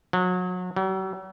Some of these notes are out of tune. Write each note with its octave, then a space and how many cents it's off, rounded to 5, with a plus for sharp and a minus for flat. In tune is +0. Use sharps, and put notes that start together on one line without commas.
F#3 -30
F#3 +45